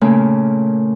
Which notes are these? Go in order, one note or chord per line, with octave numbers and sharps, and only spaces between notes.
A#2 C#3 A3 A#3 C#4